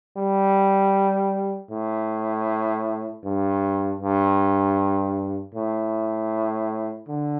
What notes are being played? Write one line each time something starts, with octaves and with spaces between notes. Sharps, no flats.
G3
A2
G2
G2
A2
D3